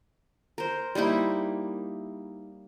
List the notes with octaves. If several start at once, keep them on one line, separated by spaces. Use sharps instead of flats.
A#4 C5
G3 A#3 D#4 E4